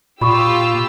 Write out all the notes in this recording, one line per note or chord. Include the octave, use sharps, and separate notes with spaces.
A#2 F4 G4 B5 C#6 D#6 E6